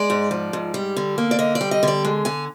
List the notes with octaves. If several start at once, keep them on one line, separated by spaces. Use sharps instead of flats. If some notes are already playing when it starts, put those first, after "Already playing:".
Already playing: G#3 D5
G#2
F3
G#2
G3
D3
A#3
D5
D3 D#5
D5
G3
D#5
D3 D5
G#3
D3 G#5